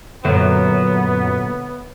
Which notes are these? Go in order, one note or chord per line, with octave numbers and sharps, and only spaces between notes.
F#2 A#2 D3 F#3 B3